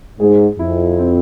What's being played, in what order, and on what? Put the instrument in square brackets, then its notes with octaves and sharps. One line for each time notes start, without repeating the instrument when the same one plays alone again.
[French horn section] G#2 [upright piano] G#4
[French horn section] F2 [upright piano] E4
[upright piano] C4